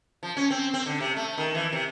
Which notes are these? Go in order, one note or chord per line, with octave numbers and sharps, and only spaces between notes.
F3
C#4
C4
C4
D3
C3
A3
D#3
E3
C3